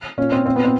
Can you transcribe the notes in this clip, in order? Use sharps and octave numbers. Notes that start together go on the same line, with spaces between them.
A#2 C#4
C4
A#2 C4
B3
C4